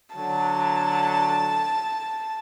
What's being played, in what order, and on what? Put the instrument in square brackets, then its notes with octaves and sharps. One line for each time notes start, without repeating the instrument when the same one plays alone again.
[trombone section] D3 F#3 [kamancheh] A5